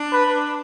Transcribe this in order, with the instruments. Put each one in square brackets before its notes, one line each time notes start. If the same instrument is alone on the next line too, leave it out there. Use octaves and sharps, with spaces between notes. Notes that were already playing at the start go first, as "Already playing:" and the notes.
Already playing: [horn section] D4
[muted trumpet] B4